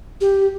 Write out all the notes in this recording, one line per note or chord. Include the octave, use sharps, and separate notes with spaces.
G4